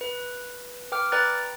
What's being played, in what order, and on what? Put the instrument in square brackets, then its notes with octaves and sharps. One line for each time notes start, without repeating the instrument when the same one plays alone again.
[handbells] B4
B4 G5 D6 F6
B4 D5 G5 A#5 F#6 A6